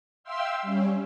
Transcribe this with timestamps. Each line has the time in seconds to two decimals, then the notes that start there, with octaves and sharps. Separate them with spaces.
0.24 E5 F5 G5 C6 E6
0.62 G3 C#4